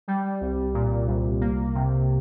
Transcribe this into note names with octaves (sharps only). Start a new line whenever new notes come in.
G3
C2
A#2
C2
A#3
C3